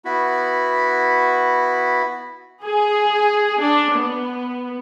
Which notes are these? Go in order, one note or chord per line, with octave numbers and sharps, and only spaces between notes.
B3 E4 F#4 B5
G#4
D4
B3